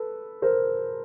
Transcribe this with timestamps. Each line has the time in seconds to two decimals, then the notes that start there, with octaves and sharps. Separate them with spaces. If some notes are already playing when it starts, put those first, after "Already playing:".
Already playing: A4 B4
0.42 A#4 C5